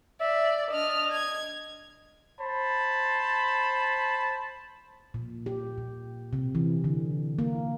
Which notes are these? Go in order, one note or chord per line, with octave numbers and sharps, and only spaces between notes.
D5 E5
D4 D#5 F6
G#6
C5 A5 B5
A#2
G4
A#2
C3
E3
D3
A#3